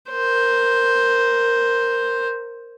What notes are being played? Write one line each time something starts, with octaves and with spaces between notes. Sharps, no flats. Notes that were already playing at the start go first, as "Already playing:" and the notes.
A#4 C5